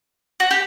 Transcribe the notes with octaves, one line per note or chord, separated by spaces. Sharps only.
F#4
G4